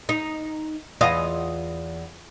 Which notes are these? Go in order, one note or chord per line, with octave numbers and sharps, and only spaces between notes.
D#4
E2 F4 D#5